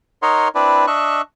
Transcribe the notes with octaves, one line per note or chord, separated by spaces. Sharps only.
D#4 A#4 C#5 D#5 F#5 C6
C4 D4 E4 B4 D5
D4 D#5 E5 C#6 F#6